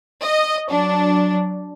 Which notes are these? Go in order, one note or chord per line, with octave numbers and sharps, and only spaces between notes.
D#5
F#3 D4